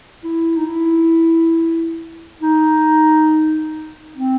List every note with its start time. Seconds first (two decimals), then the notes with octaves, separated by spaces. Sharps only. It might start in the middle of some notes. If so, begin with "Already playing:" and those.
0.24 E4
0.57 D#4
0.66 E4
2.41 D#4
4.17 C4